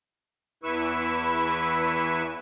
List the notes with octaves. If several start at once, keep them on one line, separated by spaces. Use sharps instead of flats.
E2 E3 E4 B4 C#6 E6